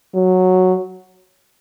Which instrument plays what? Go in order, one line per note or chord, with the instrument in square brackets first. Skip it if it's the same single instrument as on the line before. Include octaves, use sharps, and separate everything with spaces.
[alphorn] F#3